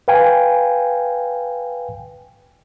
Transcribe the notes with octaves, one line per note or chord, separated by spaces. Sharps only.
B4 F5 G5 G#5